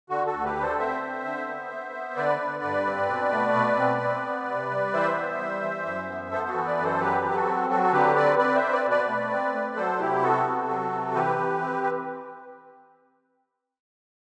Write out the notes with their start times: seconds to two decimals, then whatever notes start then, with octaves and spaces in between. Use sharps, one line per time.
0.09 D3 F#4
0.27 F#4 A4
0.33 D2
0.44 G4 B4
0.56 D3
0.61 A4 C5
0.79 C4 C5 E5
1.03 C4
1.25 D3
1.47 B3
1.72 B3
1.94 B3
2.16 D3 B4 D5
2.40 D3
2.63 G2
2.86 C4
3.09 B2
3.32 A3
3.55 B2
3.78 C4
4.02 C4
4.24 B3
4.48 C3
4.71 G3
4.94 E3 C5 E5
5.16 B3
5.39 G3
5.62 E3
5.85 F#2
6.08 B3
6.31 B3 A4 C5
6.49 F#4 A4
6.54 E3
6.66 B4 D5
6.77 F#2
6.83 A4 C5
7.00 F#3 G4 B4
7.23 F#3
7.31 B4
7.35 F#4 A4
7.46 C4
7.69 F#3 F#4 A4
7.83 A4
7.93 D3 G4 B4
8.15 C4 B4 D5
8.38 C4 B4 D5
8.55 C5 E5
8.62 C4
8.73 B4 D5
8.85 B2
8.90 B4 D5
9.08 A3
9.31 C4
9.54 A3
9.76 F#3 A4 C5
10.00 C3 E4 G4
10.23 B3 F#4 A4
10.46 C3
10.69 F#3
10.92 C3
11.14 E3 G4 B4
11.38 E3
11.61 C4
11.83 B4